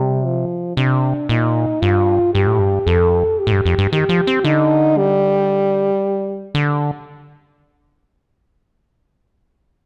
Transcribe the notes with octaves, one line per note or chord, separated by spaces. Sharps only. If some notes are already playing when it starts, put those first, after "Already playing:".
Already playing: C3 G3
F3
C3 D4
A#2 D#4
G2 F4
G2 G4
A2
G2
F2 A4
G4
A2
G2
F2
G2
D#3 G4
F3
C4
D3 D#4
G3
D3